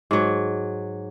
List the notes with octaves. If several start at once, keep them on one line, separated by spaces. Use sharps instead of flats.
G#2 F#3